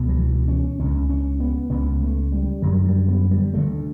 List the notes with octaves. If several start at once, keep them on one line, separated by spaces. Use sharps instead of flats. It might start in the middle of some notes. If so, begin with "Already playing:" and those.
Already playing: C#2 B2
F#3
E3
C#4
C#2 C#3 C#4
C#4
B3
C#2 C#3 B3
A3
G3
F#2 D3 F#3
G3
B3
G3
D2 D3 A3